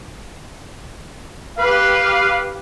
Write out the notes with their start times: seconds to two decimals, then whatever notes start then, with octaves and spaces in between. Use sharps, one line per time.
1.58 G4 B4 F5